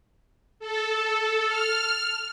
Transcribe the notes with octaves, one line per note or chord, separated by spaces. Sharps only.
A4
F6